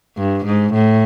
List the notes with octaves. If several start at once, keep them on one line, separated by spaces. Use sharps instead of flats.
G2
G#2
A2